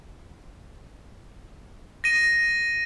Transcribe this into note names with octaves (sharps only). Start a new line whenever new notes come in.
A#6 D#7